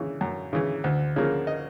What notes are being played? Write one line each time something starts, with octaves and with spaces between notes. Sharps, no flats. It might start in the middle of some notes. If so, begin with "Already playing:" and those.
Already playing: C#3 E3
F#2
C#3 E3
D2
C#3 F3 A#3
D#5